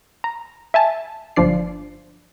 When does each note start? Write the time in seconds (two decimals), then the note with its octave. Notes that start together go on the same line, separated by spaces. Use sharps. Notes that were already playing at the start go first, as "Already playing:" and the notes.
0.24 A#5
0.74 E5 G#5 A5
1.36 G1 F3 D4 D5 C7